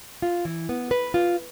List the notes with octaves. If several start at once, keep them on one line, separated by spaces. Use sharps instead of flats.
F4
E3
B3
B4
F4